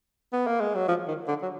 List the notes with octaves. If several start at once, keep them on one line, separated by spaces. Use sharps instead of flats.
B3
A#3
G#3
F#3
F3
D#3
D3
F#3